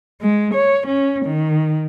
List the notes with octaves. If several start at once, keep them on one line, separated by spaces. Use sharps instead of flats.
G#3
C#5
C#4
D#3